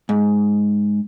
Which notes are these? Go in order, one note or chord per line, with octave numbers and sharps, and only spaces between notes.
G#2